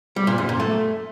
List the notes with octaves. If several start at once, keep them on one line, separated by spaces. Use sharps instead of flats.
G3
A#2
F#2
A#2
A3